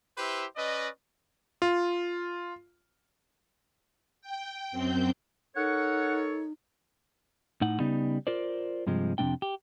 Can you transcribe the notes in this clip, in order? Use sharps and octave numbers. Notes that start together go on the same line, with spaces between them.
E4 G4 B4 C5 E5
C#4 B4 D5 D#5
F4
G5
F#2 C4 G6
D#4 A4 A#4 C#5 F#5
A2 D#4 F#5
C#3 G3 B3 D#4
F4 A#4 C5 D5
G2 C3 F3 G#3
F2 C3 F3 A#3 D4 G5
G4